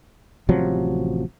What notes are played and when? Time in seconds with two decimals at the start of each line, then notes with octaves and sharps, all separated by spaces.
0.49 A1 C3 F3 F#3